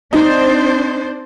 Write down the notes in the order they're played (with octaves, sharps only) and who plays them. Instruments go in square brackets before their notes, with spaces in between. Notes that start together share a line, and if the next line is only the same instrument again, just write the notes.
[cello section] C4 D4 C5 [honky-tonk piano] D#4